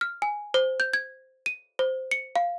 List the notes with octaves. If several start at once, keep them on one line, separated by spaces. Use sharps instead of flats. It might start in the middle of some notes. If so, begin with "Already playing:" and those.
F6
G#5
C5
G6
G#6
D#7
C5
C#7
F5